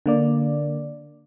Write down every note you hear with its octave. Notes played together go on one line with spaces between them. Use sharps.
D3 A#3 D5